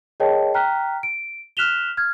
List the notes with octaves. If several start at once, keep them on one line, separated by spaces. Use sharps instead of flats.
G#4 A#4 C#5 D#5 G5 A5
G5 A#5 F6 F#6 B6
D7
F6 F#6 B6 E7 F7 G7
F6 G#6